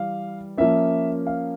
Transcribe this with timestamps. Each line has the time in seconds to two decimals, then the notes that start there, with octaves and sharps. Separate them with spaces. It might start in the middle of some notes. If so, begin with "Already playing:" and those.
Already playing: E3 G3 F5
0.58 F3 A#3 C#4 E5
1.27 F5